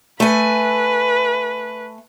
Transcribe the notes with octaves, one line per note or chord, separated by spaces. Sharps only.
A3 B4 G#5